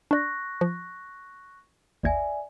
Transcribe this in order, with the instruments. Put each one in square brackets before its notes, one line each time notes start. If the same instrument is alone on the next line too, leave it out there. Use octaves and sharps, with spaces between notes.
[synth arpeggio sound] D4 D5 [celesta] C#6 F#6 A#6
[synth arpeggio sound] F3
[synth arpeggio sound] G#1 D#2 G#6 [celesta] D5 E5 G#5